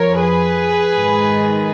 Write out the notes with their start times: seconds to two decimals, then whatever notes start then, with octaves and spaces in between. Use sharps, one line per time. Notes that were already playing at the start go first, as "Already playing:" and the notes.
Already playing: F2 F3 A#4 C#5
0.21 G#4 B4
0.95 G#2 D#3